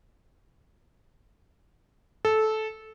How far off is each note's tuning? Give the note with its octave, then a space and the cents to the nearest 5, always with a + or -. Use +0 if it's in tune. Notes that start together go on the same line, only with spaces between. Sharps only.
A4 -15